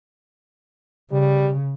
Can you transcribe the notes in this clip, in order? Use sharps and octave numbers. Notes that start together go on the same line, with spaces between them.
C#3 G3